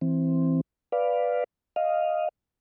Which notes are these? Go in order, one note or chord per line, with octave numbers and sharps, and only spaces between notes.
E3 C4
B4 D5 F5
D#5 F5